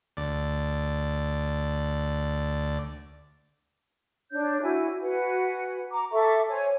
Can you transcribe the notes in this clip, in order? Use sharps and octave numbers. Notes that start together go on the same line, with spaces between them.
D2 D5
D4 C#5 G6
E4 F#4 G#5
F#4 B4 F#5 G#5
A#5 D6
A4 E5 C#6 D6
C5 C#5 G#5